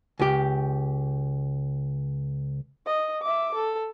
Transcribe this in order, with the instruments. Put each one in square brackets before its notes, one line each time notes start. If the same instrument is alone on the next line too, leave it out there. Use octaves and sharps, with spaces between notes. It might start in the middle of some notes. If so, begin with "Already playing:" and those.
[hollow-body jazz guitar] C#2 G4
[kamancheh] D#5
E5 D6
A4